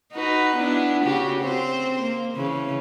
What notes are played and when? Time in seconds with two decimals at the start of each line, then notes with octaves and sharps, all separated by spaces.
0.13 D#4 F#4 B4
0.55 B3 D4 E4
1.03 C#3 F#4 G4
1.41 C4 C5
2.01 A#3
2.35 C#3 E3